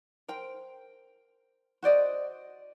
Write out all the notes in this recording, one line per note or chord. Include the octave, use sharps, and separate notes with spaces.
A#4 C5 G5
F#4 C5 D5 D#5